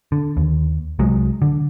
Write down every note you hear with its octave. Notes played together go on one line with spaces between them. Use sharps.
D3
D#2
C2 F#3 G#3
D3